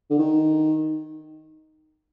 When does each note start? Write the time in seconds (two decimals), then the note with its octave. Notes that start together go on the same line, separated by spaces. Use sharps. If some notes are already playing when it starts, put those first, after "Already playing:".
0.11 D3
0.19 D#3